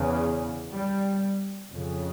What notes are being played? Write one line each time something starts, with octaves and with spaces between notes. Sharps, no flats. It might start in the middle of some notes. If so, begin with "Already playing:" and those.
Already playing: E2 C#3
G3
F2 C#3